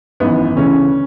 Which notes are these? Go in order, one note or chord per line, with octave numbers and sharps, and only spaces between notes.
G#1 F#2 E3 B3
D2 C#3 E3 C#4